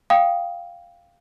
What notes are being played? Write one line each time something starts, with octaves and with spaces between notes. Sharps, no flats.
F5 G5 D#6